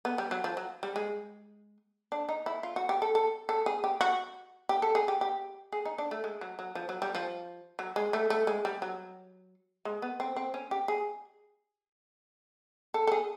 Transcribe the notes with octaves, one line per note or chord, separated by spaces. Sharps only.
B3
G3
F#3
F3
F#3
G3
G#3
D4
D#4
E4
F4
F#4
G4
A4
A4
A4
G#4
G4
F#4
G4
A4
G#4
G4
G4
G#4
D#4
D4
A3
G#3
F#3
F#3
F3
F#3
G3
F3
F#3
G#3
A3
A3
G#3
G3
F#3
G#3
B3
C4
C4
C#4
G4
G#4
A4
A4
G#4